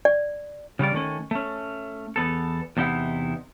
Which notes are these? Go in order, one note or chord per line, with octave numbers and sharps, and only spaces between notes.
D5
C#3 G3 C#4 D5
D#3 A3 C#4
A3 C#4
E2 B3 A4
E2 C3 D#4 E4 F#5